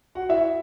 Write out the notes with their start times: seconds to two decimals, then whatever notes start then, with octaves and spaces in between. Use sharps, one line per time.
0.15 F#4 F#5
0.29 E4 E5